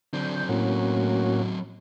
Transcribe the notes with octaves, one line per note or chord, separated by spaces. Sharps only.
D3 F#3 C4 G6
A2 A#3 C#4 F#4